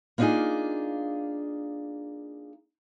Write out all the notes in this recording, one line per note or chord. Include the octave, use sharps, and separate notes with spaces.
A#3 B3 D4 D#4 F4 G#4